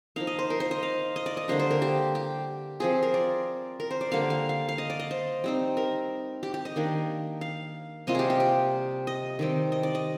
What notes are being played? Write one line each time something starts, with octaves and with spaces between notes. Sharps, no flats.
F3 A#3 D#4 F5
D#5
C5
A#4
C5
D#5
F5
D#5
D5
D#5
D3 G3 A#3 D4 C5
C5
A#4
G4
G4
F3 C4 F4 G#4
A#4
D5
A#4
C5
D5
D3 G3 A#3 F5
F5
F5
F5
D#5
D5
D#5
C5
G3 C4 D#4
A#4
G4
G4
D#5
D#3 A#3 D4
F5
C3 G3 A#3 F4 D#5
G4 G#4
G4
D5
D#5
D#3 G3 C4
D#5
D5
D#5